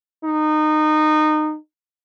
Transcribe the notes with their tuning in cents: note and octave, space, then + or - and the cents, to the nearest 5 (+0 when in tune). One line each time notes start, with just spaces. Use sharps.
D#4 -20